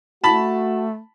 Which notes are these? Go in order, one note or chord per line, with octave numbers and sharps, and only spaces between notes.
A3 F#4 A5 B5